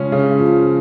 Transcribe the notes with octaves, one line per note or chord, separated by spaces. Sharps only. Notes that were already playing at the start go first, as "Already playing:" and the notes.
Already playing: C#3 F3 G#3 C#4
C#3
F3